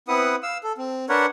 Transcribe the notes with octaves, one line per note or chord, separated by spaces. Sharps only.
B3 C4 E4 B4 F#5 D#6
F5 E6
A4
C4
D4 A#4 B4 C#5 F#5